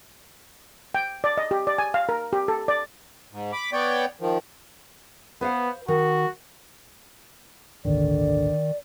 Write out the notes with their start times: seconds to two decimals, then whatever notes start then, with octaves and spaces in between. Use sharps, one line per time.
0.95 G5
1.24 D5
1.38 D#5
1.51 G4
1.67 D5
1.78 G#5
1.94 F5
2.09 A#4
2.33 G4
2.48 A4
2.68 D5
3.32 G#2
3.53 B5 D6
3.73 B3 C#5 D5 G5
4.21 D#3 F3
5.41 B3 B4 C5 F5
5.88 D#3 F#4
7.85 G#1 D2 A#2 D3 D#3 D5